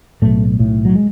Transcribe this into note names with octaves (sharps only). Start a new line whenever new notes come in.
B1 A2 A3
B1 A2
F#3
G#3